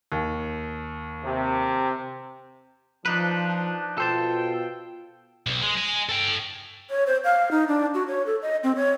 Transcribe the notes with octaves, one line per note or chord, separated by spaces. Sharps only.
D#2
C3
F3 D4 D#4 B4
B2 F4 A4 C5 G5 A5
B1
G#3
D#5 G#5
A4 G5
C#5
C5
F5
D#4
D4
F#4
C#5
A4
D#5
C4
C#5